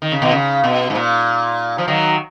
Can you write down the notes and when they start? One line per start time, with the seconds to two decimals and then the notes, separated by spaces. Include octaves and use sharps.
0.02 D#3
0.12 C#3
0.22 B2 D#3
0.32 C#3
0.64 B2
0.90 G#2
0.95 A#2
1.78 F3
1.88 D#3 F#3